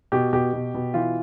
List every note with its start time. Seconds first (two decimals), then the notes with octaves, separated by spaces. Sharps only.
0.12 B2 G4
0.33 B2 G4
0.53 B2
0.74 B2
0.94 E3 F4